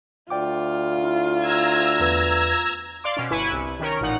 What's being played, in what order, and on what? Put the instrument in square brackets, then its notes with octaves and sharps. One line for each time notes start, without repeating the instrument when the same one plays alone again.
[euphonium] D2 [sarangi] F4 [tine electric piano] D5 G5 D6
[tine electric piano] E4
[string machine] A#5 E6 G#6
[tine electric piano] E2 B4
[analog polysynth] D5 F5 C6 D6
B2 C#4
G1 E4 B4 G#5 C#6
C2
D#3 C#4 A#4
A1 A#2 D#4 F#5